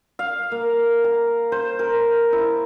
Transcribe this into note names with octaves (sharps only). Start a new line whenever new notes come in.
F5
A#3
A#5
C5
A#4
E4